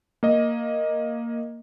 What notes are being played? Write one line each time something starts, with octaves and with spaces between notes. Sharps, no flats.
A#3 D#5